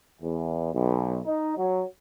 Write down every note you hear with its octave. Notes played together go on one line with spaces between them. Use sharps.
E2
B1
D#4
F#3